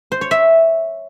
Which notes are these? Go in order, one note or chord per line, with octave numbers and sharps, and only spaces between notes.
C5
C#5
E5